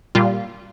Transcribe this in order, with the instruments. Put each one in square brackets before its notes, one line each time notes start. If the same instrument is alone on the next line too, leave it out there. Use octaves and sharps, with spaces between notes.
[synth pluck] A#2 G3 F4